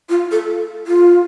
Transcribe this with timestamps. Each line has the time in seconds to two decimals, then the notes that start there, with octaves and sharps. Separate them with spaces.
0.09 F4
0.32 A4
0.87 F4